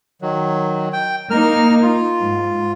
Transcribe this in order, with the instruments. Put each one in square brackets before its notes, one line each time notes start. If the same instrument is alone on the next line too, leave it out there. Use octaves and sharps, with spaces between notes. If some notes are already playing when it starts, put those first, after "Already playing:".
[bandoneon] D#3 F#3
G5
[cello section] A#3 D#4 [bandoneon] A#4 F6
[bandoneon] F4
[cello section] G#2